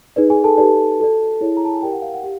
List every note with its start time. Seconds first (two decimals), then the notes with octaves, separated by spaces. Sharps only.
0.16 D#4 G#4 B4 D5
0.30 G#4 G#5
0.44 A4 A5
0.58 D#4 G4 A4 B4 D5 A5
1.00 F#4 A4 D5
1.41 E4 G#4 C#5
1.57 A#5
1.65 A5
1.74 G#5
1.82 G4 A#4 D5 G5
1.92 F#5
2.02 F5
2.14 F#5
2.23 G4 F5